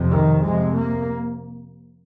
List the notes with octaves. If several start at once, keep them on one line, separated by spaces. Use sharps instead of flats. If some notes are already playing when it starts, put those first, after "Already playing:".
Already playing: F2 C3
D#3
F2 C3 G#3
A#3